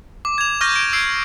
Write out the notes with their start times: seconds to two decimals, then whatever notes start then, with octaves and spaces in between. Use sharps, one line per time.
0.25 D6
0.38 G#6 F7
0.61 C#6 D6 F6 G6 A#6 D#7
0.76 D7
0.93 E6 G#6 C7 D7